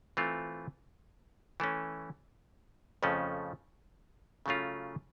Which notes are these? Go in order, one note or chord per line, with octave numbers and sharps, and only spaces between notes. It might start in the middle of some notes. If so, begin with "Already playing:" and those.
E3 A3 C4 F4
E3 A3 C#4
F2 C#3 F3 A3 C#4
C#3 F#3 A3 C#4 F4